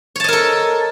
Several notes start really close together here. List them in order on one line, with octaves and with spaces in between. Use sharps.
C#5 A5 D#5 A#4 A4